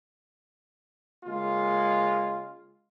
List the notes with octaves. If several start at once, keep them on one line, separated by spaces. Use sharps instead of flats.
C#3 G#3 A#3 F4